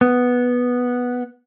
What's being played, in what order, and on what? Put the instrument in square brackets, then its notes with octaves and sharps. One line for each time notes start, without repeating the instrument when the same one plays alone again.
[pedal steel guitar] B3